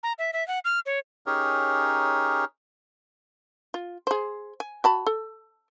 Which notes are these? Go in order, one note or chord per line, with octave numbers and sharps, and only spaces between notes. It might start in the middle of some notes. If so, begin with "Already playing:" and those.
A#5
E5
E5
F#5
F6
C#5
C#4 D#4 G4 G#4 A#4 C#5
F4
G#4 C5
G#5
F#4 A5 B5
A4